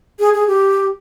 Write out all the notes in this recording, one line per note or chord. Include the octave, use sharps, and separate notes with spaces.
G#4
G#4
G4